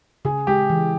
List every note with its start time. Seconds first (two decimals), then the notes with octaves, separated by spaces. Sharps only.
0.25 C#3 G#4
0.47 G#3 G4
0.70 E3